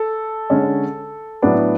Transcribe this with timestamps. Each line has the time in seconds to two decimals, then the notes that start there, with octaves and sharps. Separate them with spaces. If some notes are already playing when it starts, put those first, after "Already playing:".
Already playing: A4
0.50 D3 G#3 C#4
1.42 A2 F#3 B3 D4